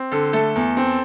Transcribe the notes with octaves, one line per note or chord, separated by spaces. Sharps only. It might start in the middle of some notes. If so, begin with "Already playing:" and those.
Already playing: C4
D3 A4
A3 A4
E2
C4